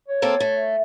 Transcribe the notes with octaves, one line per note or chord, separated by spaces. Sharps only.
C#5
A#3 C4 A4
A3